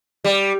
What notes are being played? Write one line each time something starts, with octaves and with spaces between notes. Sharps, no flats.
G3